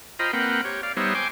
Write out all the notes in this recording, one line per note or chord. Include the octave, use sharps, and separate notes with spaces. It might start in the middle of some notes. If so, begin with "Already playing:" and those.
F4 C5 D#5 G5 A#5 B5
A#3 C4 B4 F#5 G5
G4 C#5
D5 F5
G3 B3 D#4 C5 C#5 E5
G5 G#5 C6 D6